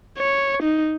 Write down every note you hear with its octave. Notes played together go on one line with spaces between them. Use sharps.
C#5
D#4